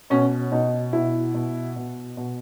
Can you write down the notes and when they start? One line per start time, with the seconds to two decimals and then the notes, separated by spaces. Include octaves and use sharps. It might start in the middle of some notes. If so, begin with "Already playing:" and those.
0.10 B2 C#4
0.52 B2 D#4
0.93 B2 E4
1.34 B2
1.76 B2
2.17 B2